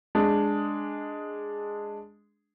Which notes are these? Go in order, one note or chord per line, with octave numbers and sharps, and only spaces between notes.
G#3 D4